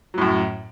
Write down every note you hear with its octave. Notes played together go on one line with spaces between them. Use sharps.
F#2 A2 F#3